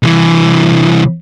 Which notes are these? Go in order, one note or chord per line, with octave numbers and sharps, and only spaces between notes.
C2 E3